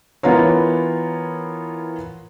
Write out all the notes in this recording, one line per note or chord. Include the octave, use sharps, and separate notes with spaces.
E3 B3 F4 A#4 C#5